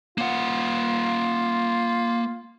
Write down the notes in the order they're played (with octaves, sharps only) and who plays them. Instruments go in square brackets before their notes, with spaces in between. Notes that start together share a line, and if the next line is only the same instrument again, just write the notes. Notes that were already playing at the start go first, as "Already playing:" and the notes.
[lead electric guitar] A#3 F#5 [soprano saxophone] F4